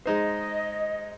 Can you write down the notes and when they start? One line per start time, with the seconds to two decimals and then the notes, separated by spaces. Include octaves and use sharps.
0.06 G#3 D#4 C5 D#5